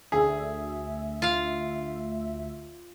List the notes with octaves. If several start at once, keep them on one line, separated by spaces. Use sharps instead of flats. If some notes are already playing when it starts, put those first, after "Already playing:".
D2 G#4 E5
F4 F5